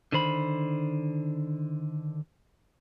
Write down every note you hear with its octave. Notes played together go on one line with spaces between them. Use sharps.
D3 D#3 C5 B5